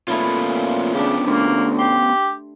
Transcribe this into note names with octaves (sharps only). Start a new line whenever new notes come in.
A#2 A3 B3 C#4 E4 F4 C#5
C#3 D4 G4
D2 A#3
G4 C6